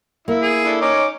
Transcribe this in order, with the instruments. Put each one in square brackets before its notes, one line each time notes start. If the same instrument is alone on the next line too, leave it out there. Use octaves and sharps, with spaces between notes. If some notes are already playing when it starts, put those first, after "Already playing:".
[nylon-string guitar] A#3 [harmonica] E4
[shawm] G#4
[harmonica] D4 E4 A4
[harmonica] C#4 D#4 C#5 [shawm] D6